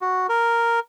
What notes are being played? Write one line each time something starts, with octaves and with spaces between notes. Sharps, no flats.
F#4
A#4